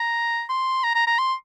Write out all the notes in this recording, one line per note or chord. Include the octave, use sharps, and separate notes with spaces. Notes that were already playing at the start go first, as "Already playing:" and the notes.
Already playing: A#5
C6
A#5
A#5
A#5
C6